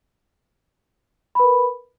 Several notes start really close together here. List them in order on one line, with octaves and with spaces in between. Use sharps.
B5 B4 A#4